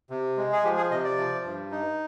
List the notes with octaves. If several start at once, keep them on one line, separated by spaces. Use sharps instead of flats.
C3
G#3
G#4
F3 G4
G#4
C3 D#5
D5
F3
G2
D#4